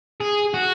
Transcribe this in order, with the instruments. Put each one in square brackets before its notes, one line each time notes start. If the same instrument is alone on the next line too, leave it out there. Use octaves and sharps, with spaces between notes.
[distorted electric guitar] G#4
F#4